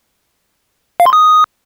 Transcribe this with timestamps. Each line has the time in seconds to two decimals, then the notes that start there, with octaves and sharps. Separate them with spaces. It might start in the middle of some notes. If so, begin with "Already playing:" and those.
1.00 F5
1.06 C6
1.13 D#6